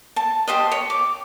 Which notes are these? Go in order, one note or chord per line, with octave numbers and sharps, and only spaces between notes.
A5
G4 C5 D#5
C#5
D6